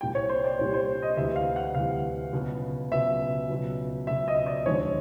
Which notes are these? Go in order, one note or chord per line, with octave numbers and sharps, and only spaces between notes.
C2 A#2 G3 G5
C#5
C5
D5
C2 A#2 G3 C#5
C5
D#5
D2 C3 E3 G3 E5
F5
F#5
D2 C3 E3 G3 F5
C#2 B2 F#3
C#2 B2 F#3 E5
C#2 B2 F#3
C#2 B2 F#3 E5
D#5
D5
D#2 D3 F3 G#3 C#5